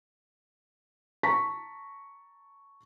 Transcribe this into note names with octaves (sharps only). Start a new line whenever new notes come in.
A5 A#5 C#6 A#6 B6